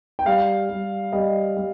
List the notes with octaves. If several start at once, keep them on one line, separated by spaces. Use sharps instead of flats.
G5
G3 F5
G3
G3 D#5
G3